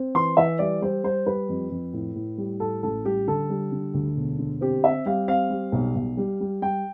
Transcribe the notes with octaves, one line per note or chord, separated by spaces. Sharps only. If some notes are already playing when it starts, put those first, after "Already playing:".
Already playing: C4
E3 C6
E3 E5
G3 D5
G3 C5
G3 C5
G3 B4
F2
F2
A2
A2
G3
A2 A4
A1 A4
G3 G4
D3 A4
G3
D3
D2
E1
D3
C4 G4
C4 E5
G3 F5
C4 F5
G3
B1
B1
G3
G3
G3 G5